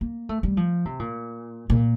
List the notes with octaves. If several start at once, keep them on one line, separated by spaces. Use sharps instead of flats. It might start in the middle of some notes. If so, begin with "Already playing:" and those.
A#3
A3
G3
F3
C3
A#2
A#2